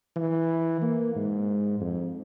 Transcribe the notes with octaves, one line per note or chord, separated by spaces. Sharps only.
E3
A#3
G#2
F2